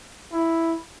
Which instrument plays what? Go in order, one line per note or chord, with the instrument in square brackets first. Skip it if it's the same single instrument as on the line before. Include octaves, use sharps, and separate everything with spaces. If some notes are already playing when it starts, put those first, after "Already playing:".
[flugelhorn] E4